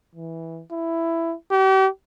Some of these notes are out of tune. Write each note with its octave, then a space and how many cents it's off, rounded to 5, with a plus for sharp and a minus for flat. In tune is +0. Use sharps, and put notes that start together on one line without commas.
E3 -10
E4 +10
G4 -40